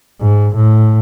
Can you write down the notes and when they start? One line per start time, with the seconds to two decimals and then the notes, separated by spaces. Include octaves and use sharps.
0.21 G#2
0.56 A2